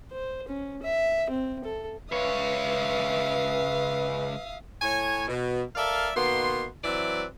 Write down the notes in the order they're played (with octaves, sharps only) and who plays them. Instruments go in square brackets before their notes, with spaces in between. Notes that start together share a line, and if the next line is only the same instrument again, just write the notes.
[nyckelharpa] C5
C#4
E5
C4
A4
[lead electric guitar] C#2 C#5 [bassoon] B4 [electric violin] E5 [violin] F5 D#6
[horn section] A2 C#5 G#5
B2
A4 A#4 D5 E5 F5
B2 D#3 A#3 B3 C6
E3 F#3 C4 B4 D5 E5